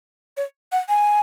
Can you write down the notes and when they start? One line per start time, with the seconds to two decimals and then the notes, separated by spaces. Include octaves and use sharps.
0.37 C#5
0.72 F#5
0.89 G#5